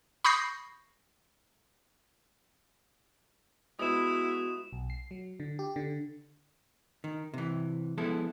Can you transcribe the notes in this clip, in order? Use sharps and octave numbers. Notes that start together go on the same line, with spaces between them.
B5 C#6 D#6 G6 A#6 C7
G#3 B3 E4 F#4 D#6 E7
B1
C7
F#3
D3
G4
D3
D#3
C3 E3
F3 G#3 B3 E4 A4